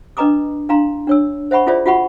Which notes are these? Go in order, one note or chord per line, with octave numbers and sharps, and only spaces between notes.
D4 B4 D#5 A#5 D6 D#6
D4 E4 F5 A#5 C6
D4 C#5 E6
C5 E5 F#5 B5 C#6
E4 F4 G#4 C5 D5 E5
F4 F#4 E5 F#5 B5 C#6